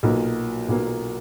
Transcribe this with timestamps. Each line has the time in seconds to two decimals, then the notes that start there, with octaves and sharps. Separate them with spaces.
0.03 B1 A#2 F#3 A#3
0.69 B1 A#2 F#3 A#3